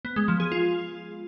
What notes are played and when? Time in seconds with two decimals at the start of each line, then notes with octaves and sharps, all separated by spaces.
0.05 B3
0.16 G#3
0.28 F3
0.40 G#4
0.52 F4